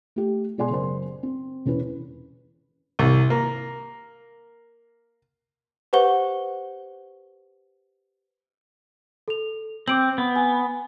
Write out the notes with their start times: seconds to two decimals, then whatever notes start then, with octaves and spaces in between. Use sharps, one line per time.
0.16 A3 G4
0.58 B2 G#3 D5 G#5 C6
0.70 F#1 A#4 C5 C6
1.23 C4
1.66 E1 C#4 E4 B4
2.99 C2
3.30 A#3
5.93 G4 B4 C5 F#5 C#6 G7
9.28 A4 F7
9.88 C4 D6 D7 F#7
10.18 B3
10.36 G#5